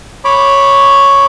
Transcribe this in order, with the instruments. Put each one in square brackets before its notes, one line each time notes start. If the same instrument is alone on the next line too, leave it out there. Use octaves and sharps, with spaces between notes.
[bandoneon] C#5 B5 D6